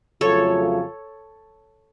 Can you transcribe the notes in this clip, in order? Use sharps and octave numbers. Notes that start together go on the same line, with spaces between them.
F2 C#3 F#3 A3 F4 A4 C#5